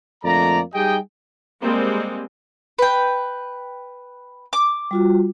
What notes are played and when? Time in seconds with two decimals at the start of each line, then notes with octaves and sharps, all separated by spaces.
0.24 F2 D3 A3 A#3 D5 A#5
0.74 G3 D#4 G4 G#4 D#5 G5
1.62 G3 G#3 A#3 C4
2.79 B4 G5
4.53 D6
4.91 G3 F4 F#4